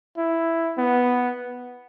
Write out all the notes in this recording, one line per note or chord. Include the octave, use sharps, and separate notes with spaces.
E4
B3